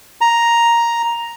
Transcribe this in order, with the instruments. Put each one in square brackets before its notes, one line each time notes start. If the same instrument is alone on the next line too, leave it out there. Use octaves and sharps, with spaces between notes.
[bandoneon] A#5